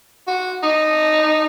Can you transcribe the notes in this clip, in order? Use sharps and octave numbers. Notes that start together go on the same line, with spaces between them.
F#4
D#4